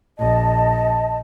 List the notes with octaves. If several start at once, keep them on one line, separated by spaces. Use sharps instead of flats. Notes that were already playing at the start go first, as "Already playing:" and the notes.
A#1 D#5 A5